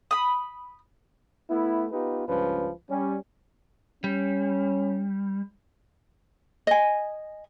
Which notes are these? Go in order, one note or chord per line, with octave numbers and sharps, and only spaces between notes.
B5 D#6
A3 B3 E4
B3 D#4 F4 G4 B4
C#2 G2 F3 C#4 B4
G3 C#4
G3 C#4
D#5 G#5